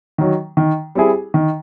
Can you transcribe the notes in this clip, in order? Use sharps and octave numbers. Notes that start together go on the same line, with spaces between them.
D#3 F#3
D#3
G3 C4 E4 G#4
D#3